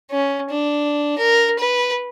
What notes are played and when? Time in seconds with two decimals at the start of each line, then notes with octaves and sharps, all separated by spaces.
0.11 C#4
0.50 D4
1.18 A#4
1.59 B4